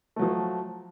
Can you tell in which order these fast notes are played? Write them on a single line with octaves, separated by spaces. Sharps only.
A3 F#3 F3